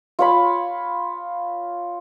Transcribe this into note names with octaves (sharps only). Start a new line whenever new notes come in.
F4 C#5 B5